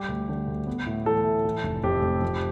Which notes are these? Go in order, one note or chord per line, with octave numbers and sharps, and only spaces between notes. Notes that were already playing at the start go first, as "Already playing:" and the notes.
Already playing: G3 G4
D2
D3
D2
B3
A2
E3 A4
A2
E3
F1
F2 G4
F1
F3